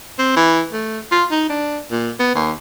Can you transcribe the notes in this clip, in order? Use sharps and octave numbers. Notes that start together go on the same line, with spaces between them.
C4
E3
A3
F4
D#4
D4
A#2
B3
D#2